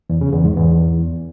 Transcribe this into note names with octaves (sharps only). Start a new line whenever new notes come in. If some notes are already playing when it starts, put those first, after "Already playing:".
E2
C#3
E2
G#2
E2